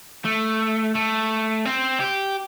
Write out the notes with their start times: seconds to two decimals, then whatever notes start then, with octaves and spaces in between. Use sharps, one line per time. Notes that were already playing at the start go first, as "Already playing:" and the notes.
0.25 A3
0.95 A3
1.65 C4
2.00 G4